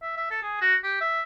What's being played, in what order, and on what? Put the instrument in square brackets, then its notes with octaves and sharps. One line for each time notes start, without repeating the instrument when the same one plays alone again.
[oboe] E5
E5
A4
G#4
F#4
G4
E5